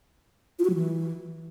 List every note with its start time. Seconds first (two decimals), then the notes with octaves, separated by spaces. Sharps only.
0.59 F4
0.64 F#4
0.70 F#3
0.75 E3